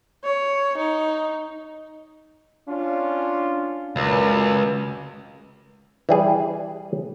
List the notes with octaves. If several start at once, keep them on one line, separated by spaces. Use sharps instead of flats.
C#5
D#4
C#4 D4 F4
C#2 F#2 A#2
E3 G3 G#4